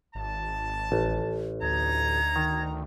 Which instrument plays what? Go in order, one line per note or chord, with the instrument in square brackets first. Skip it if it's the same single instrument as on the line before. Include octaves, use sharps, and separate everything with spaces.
[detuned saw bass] G#1 [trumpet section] A5
[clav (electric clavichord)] A1
[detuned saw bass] D2 [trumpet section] D#4 A#5 [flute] G#6
[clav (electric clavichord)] D#3